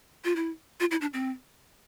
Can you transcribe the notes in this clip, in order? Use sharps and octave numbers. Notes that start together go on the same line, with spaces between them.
F4
E4
F4
E4
D4
C4